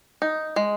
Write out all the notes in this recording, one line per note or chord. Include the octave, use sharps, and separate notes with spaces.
D#4
G#3